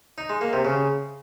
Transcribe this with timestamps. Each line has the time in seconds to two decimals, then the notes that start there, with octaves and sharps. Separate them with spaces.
0.18 D#4
0.30 G#3
0.41 A#3
0.53 C3
0.65 C#3